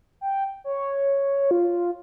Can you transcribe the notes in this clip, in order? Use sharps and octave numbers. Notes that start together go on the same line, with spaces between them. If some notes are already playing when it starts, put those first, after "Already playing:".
G5
C#5
F4